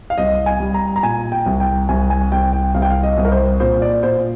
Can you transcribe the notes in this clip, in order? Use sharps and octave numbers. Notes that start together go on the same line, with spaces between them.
F5
C2 D#5
G#5
G3
A#5
A#5
A#2 G#5
G5
C2
G5
C2 G#5
G#5
C2 G5
G5
C2 F5
G5
F5
D#5
C2
A#4
C5
A#2 C5
D5
A#2 C5